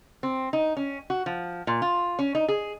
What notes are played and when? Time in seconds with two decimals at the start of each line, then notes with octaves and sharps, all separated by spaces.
0.23 C4
0.53 D#4
0.77 C#4
1.10 F#4
1.26 F3
1.67 A#2
1.82 F4
2.19 C#4
2.35 D#4
2.49 G#4